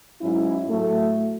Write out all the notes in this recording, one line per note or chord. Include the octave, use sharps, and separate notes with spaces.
G#2 F#3 C#4 E4
A2 F#3 A3